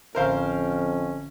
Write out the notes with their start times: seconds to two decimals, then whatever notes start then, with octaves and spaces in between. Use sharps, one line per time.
0.15 A1 F2 D3 C#4 A#4 C5 E5 F5